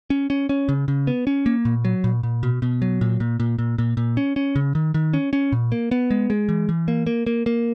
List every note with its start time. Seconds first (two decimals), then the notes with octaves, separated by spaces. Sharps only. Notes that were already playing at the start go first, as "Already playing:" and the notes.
0.10 C#4
0.30 C#4
0.49 C#4
0.69 C#3
0.88 C#3
1.07 B3
1.27 C#4
1.46 A#3
1.65 A#2
1.85 F#3
2.04 A#2
2.23 A#2
2.43 B2
2.62 B2
2.82 F#3
3.01 A#2
3.20 A#2
3.40 A#2
3.59 A#2
3.78 A#2
3.97 A#2
4.17 C#4
4.36 C#4
4.56 C#3
4.75 D#3
4.94 D#3
5.14 C#4
5.33 C#4
5.52 A#2
5.72 A#3
5.91 B3
6.11 G#3
6.30 G#3
6.49 E3
6.69 E3
6.88 A#3
7.07 A#3
7.27 A#3
7.46 A#3